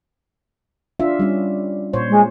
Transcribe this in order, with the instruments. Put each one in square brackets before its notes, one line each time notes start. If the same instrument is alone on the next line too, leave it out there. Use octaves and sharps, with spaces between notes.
[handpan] D4 F4 E5
G3 C#4
A#2 C5 C#5
[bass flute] G#3